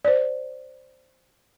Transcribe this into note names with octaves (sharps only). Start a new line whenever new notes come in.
C5 D5